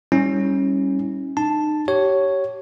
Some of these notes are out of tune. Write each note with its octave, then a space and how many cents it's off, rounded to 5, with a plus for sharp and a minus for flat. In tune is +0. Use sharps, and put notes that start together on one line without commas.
G3 +5 C#4 -15 E4 -45
D#4 -35 A5 +0
G4 -25 C#5 +0